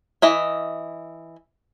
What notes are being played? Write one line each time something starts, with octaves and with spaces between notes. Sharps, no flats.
E3 D#5 E5